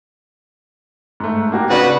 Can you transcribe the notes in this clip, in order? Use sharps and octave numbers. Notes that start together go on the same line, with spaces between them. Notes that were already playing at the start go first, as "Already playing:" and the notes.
G#2 A3
A#3 F#4 G4
C#3 D4 F#4 B4